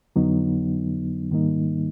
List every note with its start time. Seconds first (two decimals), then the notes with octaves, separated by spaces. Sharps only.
0.16 F2 D3 F#3 B3 D#4
1.31 G#2 D#3 G3 A#3 D#4